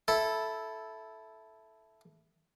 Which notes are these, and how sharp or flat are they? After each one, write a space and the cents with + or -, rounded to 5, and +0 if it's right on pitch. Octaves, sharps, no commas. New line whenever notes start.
E4 +0 A4 -10